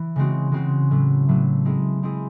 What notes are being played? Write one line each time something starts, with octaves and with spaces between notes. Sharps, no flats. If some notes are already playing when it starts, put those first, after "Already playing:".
Already playing: E3
C#3 G#3 C4 F#4
C#3 G#3 C4 F#4
A2 F#3 A3
A2 F#3 A3
G#3 C4 E4 G#4
G#3 C4 E4 G#4